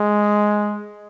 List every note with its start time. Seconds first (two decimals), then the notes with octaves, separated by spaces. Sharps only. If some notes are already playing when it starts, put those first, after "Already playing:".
Already playing: G#3